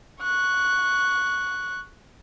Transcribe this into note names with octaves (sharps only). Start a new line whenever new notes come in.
C#6 F#6